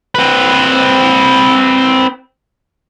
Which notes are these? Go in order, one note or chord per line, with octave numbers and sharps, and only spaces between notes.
C4 B4